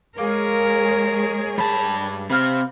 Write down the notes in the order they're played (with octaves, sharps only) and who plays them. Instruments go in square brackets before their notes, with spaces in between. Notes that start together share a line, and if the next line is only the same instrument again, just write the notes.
[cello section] G#3 G#4 C#5 [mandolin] A#3 [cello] A#4
[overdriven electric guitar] G2 A5 [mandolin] B5
[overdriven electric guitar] C3 C4 [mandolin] B4 F5 F6